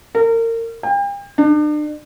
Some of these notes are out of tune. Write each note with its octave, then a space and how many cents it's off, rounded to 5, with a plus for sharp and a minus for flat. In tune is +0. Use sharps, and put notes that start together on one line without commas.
A#4 -30
G5 +40
D4 +40